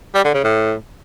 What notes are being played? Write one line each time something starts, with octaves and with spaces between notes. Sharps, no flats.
G3
D3
C#3
A2